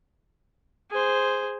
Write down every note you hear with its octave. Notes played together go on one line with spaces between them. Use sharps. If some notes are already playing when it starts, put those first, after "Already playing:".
G#4 C5